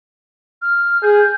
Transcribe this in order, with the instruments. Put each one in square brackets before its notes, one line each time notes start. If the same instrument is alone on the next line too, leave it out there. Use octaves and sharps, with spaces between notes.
[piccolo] F6
[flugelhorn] G#4 [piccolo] G6